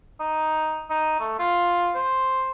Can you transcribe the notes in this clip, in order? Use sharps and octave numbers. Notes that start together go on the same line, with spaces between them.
D#4
D#4
A3
F4
C5